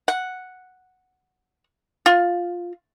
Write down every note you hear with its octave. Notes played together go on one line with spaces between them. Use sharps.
F#5
F4